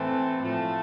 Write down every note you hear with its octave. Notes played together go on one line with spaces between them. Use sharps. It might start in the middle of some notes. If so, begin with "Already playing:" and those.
Already playing: A2 E3 A3 C4
A2 F3 A3